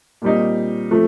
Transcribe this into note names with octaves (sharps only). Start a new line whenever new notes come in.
A#2 G3 C4 D#4
F3 A3 C4